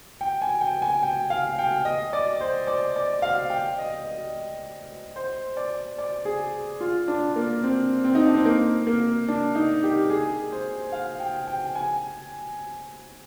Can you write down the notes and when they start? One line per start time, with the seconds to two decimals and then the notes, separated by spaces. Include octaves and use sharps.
0.21 G5
0.42 G#5
0.61 G5
0.82 G#5
1.03 G5
1.30 F5
1.59 G5
1.85 D#5
2.13 D5
2.41 C5
2.67 D5
2.96 D5
3.22 F5
3.50 G5
3.79 D#5
4.05 D#5
5.16 C5
5.57 D5
5.98 D5
6.25 G#4
6.81 F4
7.08 D4
7.36 A#3
7.64 C4
8.04 C4
8.15 D#4
8.25 D4
8.35 C4
8.45 A#3
8.87 A#3
9.29 D4
9.55 D#4
9.83 G4
10.10 G#4
10.52 C5
10.92 F5
11.20 G5
11.47 G5
11.75 G#5